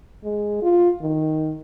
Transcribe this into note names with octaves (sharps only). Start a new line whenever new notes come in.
G#3
F4
D#3